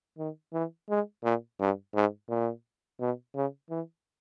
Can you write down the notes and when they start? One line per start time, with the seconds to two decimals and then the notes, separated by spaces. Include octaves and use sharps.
0.18 D#3
0.53 E3
0.90 G#3
1.24 A#2
1.60 G2
1.95 G#2
2.29 A#2
3.00 B2
3.35 C#3
3.70 E3